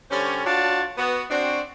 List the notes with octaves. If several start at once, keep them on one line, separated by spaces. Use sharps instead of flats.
D3 G3 C4 C#4
D4 F4 F#4 C#5 F#5 A5
B3 F#4
C4 D4 F#4